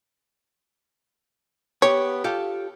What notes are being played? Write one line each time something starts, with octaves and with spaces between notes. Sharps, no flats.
B3 G4 C#5
F4 G4 A4